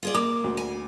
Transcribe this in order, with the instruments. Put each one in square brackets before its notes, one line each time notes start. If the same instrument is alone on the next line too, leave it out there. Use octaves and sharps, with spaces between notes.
[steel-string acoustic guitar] F4 G#4 D5
[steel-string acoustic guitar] A#3 [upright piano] D6
[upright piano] D2
[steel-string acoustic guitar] G#5